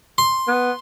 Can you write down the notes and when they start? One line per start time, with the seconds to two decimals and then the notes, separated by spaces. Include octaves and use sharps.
0.18 C6
0.48 B3